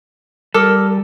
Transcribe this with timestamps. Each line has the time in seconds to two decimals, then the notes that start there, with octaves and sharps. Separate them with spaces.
0.54 G3 A4 A#4 D6 E6